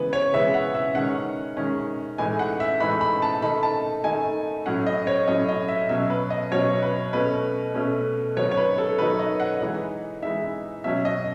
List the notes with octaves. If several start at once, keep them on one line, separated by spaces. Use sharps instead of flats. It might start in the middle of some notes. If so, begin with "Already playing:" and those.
Already playing: C#3 E3 G#3 B3 B4
C#5
C#3 E3 G#3 B3 E5
F#5
E5
D#3 G#3 C#4 F#5
D#3 G#3 C#4
A2 E3 G#3 D#4 G#5
F#5
E5
A2 E3 G#3 D#4 B5
B5
A5
D#3 A3 D#4 B5
A5
D#3 A3 D#4 G#5
A2 F#3 C#4 F#5
D#5
C#5
A2 F#3 C#4 D#5
D#5
E5
B2 F#3 C#4 E5
B4
D#5
B2 F#3 C#4 C#5
B4
B2 A3 C#4 B4
B2 A3 C#4
D#3 F#3 B3 D#4 C#5
C#5
B4
A4
D#3 F#3 B3 D#4 B4
D#5
F#5
E3 G#3 D#4
E3 G#3 D#4 E5
B2 F#3 C#4 E5
D#5